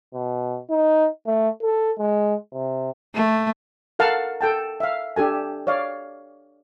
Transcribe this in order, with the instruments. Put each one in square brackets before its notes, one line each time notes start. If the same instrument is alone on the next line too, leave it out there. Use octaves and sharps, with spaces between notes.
[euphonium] B2
D#4
A3
A4
G#3
C3
[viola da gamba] A3
[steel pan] A4 A#4 F5 F#5 A5
A4 G5 A5
E5 F5
D4 G4 A4 G#5
C#5 D5 F5